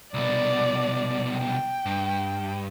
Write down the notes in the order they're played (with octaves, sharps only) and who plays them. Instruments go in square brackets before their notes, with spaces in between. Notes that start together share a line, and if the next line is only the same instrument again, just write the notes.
[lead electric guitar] C2 B2 [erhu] D5
[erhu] G5
[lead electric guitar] G2